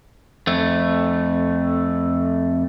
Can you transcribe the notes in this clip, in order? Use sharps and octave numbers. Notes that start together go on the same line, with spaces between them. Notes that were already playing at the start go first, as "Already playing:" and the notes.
F2 A3